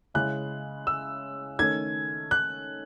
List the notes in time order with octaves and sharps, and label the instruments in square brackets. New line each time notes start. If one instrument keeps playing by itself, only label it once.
[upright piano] C#3 G#3 C#4 E4 [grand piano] F#6
[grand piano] E6
[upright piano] D#3 A3 C#4 [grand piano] G#6
[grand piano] F#6